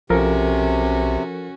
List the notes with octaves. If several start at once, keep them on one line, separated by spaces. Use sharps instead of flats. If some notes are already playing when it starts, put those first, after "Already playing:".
B1 C3 F3 C#4 F#4 A4 A#4